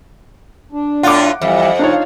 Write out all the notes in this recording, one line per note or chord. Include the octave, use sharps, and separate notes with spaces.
D4
A2 F4 F#5 D6
F2 E3 G3 E5
D4 D#4 F4 C#5 F5